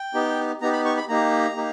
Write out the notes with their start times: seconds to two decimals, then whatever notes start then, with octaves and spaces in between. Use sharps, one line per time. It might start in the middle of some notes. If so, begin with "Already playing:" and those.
Already playing: G5
0.14 B3 D#4 G4
0.61 B3 D#4 G4 A#5
0.73 B5
0.85 C#6
0.97 B5
1.09 A#3 D#4 G4 A#5
1.56 A#3 D#4 G4